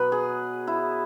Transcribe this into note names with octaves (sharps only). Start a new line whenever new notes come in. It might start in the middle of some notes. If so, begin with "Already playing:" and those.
Already playing: B2 F#3 B3 B4
G#4
E4